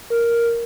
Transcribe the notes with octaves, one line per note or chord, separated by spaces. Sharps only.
A#4